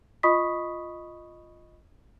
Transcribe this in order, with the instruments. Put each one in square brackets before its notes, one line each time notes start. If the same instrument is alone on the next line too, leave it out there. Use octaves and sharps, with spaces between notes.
[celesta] F4 D#5 B5 C#6 D#6 B6